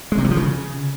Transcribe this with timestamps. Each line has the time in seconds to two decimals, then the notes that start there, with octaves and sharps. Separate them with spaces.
0.12 G#3
0.18 C3
0.24 E3
0.31 F3
0.37 C#3